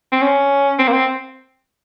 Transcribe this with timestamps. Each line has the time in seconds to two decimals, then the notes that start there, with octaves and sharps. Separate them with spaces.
0.12 C4
0.22 C#4
0.79 C4
0.88 A#3
0.93 C4